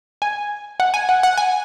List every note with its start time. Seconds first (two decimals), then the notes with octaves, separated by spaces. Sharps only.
0.22 G#5
0.80 F#5
0.94 G#5
1.09 F#5
1.23 F#5
1.38 G#5